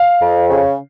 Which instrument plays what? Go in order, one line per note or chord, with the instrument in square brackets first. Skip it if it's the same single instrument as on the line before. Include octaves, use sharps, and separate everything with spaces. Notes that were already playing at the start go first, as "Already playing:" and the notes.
Already playing: [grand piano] F5
[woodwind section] F2
C#3